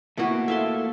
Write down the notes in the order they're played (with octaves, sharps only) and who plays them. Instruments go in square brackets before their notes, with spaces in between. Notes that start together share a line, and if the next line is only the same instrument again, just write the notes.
[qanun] B2 F#4 [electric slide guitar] A3 A#3 E4
[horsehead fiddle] A4 [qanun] E5 F5 C6